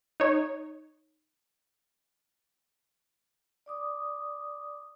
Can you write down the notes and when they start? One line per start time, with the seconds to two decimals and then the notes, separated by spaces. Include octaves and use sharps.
0.20 D#4 C#5
3.66 D5 D6 D#6